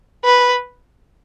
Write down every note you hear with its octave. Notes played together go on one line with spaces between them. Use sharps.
B4